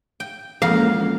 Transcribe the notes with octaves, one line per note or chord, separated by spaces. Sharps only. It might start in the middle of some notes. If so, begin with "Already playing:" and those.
G5
F2 E3 G#3 A#3 C#4 F5 F#5 A#5